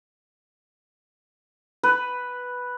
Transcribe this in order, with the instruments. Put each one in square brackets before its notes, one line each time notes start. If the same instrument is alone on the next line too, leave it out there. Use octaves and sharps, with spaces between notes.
[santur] B4